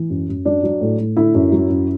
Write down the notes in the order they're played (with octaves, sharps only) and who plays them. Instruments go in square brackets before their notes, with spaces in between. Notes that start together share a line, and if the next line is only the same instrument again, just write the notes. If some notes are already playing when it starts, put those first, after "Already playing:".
Already playing: [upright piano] E3
F#2
F#2
F#3 D4
F#3
A2
A2
D3 E4
F#2
F#3
F#2